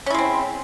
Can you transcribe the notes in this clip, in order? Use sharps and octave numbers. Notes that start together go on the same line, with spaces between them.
G#3 C4 C#4 E4